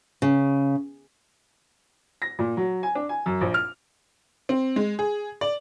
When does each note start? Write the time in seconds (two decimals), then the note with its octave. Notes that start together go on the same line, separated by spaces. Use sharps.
0.22 C#3
2.22 A#6
2.39 A#2
2.57 F#3
2.83 G#5
2.95 D4
3.09 G#5
3.26 F#2
3.41 A#1
3.54 F6
4.49 C4
4.76 G#3
4.99 G#4
5.41 D5